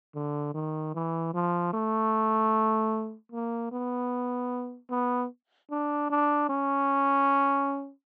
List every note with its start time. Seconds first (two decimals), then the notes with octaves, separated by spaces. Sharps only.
0.15 D3
0.55 D#3
0.95 E3
1.34 F3
1.73 A3
3.32 A#3
3.72 B3
4.90 B3
5.70 D4
6.10 D4
6.49 C#4